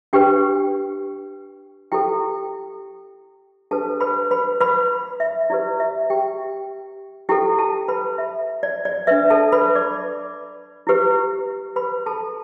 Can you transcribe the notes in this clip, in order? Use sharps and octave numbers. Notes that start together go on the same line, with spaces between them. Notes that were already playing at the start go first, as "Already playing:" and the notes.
D4 G4 B4 G5
E4 G4 A4 G5
D4 G4 A4 B4 A5
B4 B5
B4 B5
B4 B5
E5
E4 G4 B4 D5
E5
G4 G5
E4 G4 A4 G5
A4 A5
B4 B5
E5
D5
D5
D4 B4 E5
A4 A5
B4 B5
D5 D6
E4 G4 B4
B4 B5
A4 A5